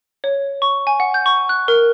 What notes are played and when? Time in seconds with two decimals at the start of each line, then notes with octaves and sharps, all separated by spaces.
0.24 C#5
0.62 C#6
0.87 G#5
1.00 F#5
1.14 G6
1.26 C#6
1.49 F#6
1.68 A#4